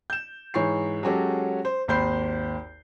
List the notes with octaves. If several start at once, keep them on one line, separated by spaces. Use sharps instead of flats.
G6 E7
G#2 E3 C#5 C#6 C7
F#3 G#3 C#4 F#4 G4 A4
C5
G#1 D#2 C5 B5 G6 C7